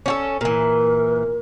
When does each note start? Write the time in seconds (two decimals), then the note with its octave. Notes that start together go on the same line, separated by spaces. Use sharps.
0.06 C#4 F#4 A4
0.41 A#2 E3 A#4